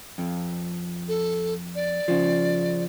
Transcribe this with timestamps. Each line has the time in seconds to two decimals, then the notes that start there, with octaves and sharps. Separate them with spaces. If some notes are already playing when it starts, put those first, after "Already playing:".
0.18 F2
1.08 A4
1.75 D5
2.08 C#3 F3